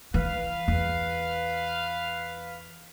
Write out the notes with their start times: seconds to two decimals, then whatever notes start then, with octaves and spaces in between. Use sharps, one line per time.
0.14 E3 B4 F5
0.68 E2